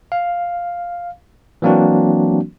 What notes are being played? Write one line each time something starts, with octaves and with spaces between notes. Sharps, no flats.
F5
E3 F#3 A#3 C4 D4 F#4